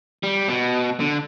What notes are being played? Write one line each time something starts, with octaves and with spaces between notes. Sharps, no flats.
G3
B2
D3